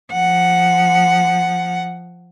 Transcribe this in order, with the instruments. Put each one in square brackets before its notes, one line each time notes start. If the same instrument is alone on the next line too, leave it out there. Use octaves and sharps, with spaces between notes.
[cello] F3 F#5